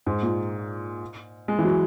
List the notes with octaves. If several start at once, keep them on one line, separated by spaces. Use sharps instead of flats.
G#2
A#2
G#3
E3
F#3